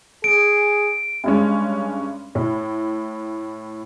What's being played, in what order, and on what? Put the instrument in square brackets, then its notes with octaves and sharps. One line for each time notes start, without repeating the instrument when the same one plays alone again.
[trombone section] G#4 [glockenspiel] D7
[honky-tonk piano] G2 G#3 C#4
A2